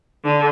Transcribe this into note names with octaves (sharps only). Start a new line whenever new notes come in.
D3